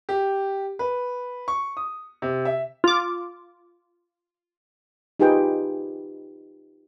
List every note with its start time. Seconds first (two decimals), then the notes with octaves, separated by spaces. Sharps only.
0.09 G4
0.79 B4
1.48 C#6
1.77 D#6
2.22 C3
2.45 E5
2.84 F4 D6
5.20 D#4 F4 G4 G#4 B4 G5